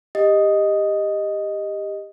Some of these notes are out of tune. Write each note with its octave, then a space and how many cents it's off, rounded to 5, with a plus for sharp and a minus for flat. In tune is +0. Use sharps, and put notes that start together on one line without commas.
G4 +20 D#5 +0